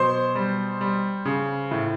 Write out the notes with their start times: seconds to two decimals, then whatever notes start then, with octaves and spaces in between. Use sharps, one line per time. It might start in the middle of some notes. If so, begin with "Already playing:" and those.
Already playing: B2 F#3 C5 C6
0.35 G3
0.81 G3
1.25 C#3
1.71 A2